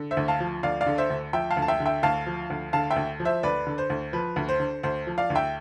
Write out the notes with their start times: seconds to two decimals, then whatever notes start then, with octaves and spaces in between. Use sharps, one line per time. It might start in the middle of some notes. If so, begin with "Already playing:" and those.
Already playing: D3
0.11 C5 E5
0.17 D2
0.28 F5 A5
0.40 F3
0.63 D2 D5 F5
0.81 D5 F5
0.87 D3
0.98 C5 E5
1.10 D2
1.33 F3 E5 G5
1.50 F5 A5
1.57 D2
1.62 A5
1.68 E5 G5
1.80 D3
1.86 E5 G5
2.03 D2 F5 A5
2.27 F3
2.50 D2
2.73 D3 F5 A5
2.91 E5 G5
2.96 D2
3.20 F3
3.25 C5 E5
3.43 D2 B4 D5
3.67 D3
3.78 C5
3.90 D2
4.13 F3 B4
4.36 D2
4.49 C5
4.60 D3
4.83 D2 C5
5.07 F3
5.18 D5 F5
5.30 D2
5.35 E5 G5